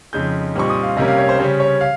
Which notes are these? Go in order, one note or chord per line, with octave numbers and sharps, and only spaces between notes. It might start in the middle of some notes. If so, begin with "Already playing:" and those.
F2 C#3 G#3 D#4 G6
A#2 G3 C4 D#4 C#6
D#6
F5
C3 G3 A#3 C#4 D#5
F5
C#5
C5
C#3 G3 C#4 C5
C#5
F5